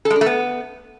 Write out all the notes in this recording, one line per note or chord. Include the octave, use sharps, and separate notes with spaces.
A4
G#3
D4
A3
B3